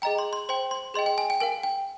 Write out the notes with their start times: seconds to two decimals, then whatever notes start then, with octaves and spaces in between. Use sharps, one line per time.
0.02 G#4 D#5 G5 A#5
0.18 C6
0.33 C6
0.49 C5 G5 C6
0.71 C6
0.94 G#4 D#5 G5 C6
1.06 G5
1.18 G#5
1.30 G5
1.40 A#4 F5 G#5
1.63 G5